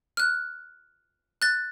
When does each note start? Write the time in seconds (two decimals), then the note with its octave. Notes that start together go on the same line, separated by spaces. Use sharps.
0.17 F6 F#6
1.42 F#6 A6